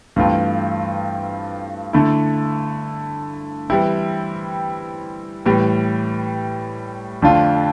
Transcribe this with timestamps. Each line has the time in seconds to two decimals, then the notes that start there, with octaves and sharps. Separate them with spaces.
0.16 G2 E3 A3 C4 F4
1.93 D3 A3 E4
3.70 E3 G3 C4 E4
5.46 A2 E3 G3
7.22 F2 D3 A3 D4 F4